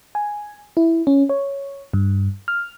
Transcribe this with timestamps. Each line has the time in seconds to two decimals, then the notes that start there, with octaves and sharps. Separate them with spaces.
0.15 G#5
0.77 E4
1.07 C#4
1.29 C#5
1.93 G2
2.48 F6